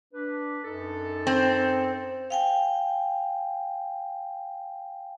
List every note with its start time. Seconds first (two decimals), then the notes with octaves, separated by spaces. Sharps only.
0.14 D4 B4
0.64 F#2 D#4 A4
1.27 C4
2.30 F5 G5 G#5